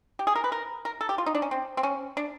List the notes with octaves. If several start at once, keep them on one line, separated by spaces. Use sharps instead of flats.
G4
G#4
A#4
B4
A#4
A#4
A4
G4
F4
D#4
D4
C#4
C4
C4
C#4
D4